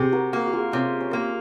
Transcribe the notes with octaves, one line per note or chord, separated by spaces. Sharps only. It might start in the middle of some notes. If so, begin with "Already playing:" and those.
Already playing: C3 G#4
F#4 A#4
A#3 F#4 A#4
F#4
F4 G#4
C3 C#4 F4
C#4
A#3